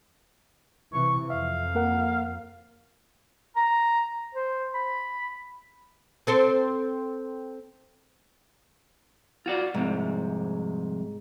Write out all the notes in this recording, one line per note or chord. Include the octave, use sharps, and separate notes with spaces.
C3 E3 C#6
F2 E5 F5
A#3 A#4 F#5
A#5
C5
B5
C4 A4 C5
F4 F#4 D5
C2 F2 G#2 C3